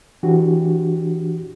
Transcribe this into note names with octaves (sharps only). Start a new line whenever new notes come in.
E3 D4 F#4 G4